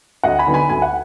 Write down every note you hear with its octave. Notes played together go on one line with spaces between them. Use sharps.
D2 D#5 F#5
G#5 B5
D3 F#3 B3 D#4
G#5 B5
D2 G#5
F#5